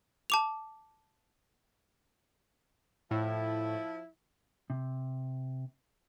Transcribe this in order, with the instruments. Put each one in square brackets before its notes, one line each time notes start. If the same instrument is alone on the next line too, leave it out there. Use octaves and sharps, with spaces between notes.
[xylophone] A5 D6 F7
[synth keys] A2 [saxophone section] F3 E4
[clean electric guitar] C3